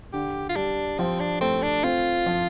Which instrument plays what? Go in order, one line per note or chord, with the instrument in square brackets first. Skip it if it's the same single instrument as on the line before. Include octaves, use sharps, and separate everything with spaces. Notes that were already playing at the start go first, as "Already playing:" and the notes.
[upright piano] D3 [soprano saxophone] G4
[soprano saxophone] F4
[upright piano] G3 [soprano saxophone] D4
[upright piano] F3 [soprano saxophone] C4
[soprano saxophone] D4
[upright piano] A3 [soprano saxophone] C4
[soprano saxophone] D4
[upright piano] C4 [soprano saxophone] F4
[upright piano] F3